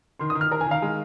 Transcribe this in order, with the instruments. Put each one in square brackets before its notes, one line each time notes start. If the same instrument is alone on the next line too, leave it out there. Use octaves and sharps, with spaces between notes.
[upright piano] D#3 [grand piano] C6
[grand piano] D#6
[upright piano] D#3
[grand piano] F6
[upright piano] A#4
[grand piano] G#5
[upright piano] D#3 [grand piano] F5
[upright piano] G#3